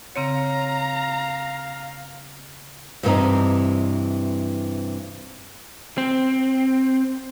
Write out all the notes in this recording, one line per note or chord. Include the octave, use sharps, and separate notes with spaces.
C#3 C4 C#5 F5 A#5
G2 C3 E3 B3 C4 D#4
C4